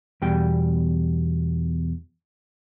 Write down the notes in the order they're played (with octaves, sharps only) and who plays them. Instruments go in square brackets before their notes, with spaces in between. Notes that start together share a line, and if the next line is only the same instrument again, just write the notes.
[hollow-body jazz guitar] E2 B2 G3 G5